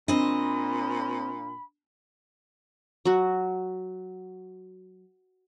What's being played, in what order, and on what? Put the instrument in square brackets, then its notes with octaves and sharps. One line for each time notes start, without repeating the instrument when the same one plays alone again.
[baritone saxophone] A#2 [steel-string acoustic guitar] C4 D#5 [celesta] D4 [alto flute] B5
[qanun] F#3 F#4